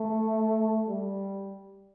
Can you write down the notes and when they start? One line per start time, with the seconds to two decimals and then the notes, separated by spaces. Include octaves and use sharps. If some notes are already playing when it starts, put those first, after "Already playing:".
Already playing: A3
0.88 G3